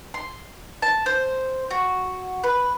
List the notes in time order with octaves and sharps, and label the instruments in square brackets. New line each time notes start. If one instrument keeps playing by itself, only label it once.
[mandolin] C6
A5
C5
F#4
B4